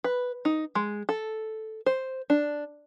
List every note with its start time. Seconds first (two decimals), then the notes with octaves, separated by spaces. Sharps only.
0.04 B4
0.45 D#4
0.75 G#3
1.09 A4
1.86 C5
2.30 D4